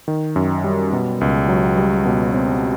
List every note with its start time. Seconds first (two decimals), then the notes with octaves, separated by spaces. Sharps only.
0.08 D#3
0.36 F#2
0.64 G3
0.93 B2
1.21 C#2
1.49 F#3
1.77 G3
2.05 B2
2.34 C4